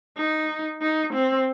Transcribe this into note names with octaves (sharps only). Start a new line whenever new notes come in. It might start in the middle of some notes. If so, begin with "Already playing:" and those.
D#4
D#4
C4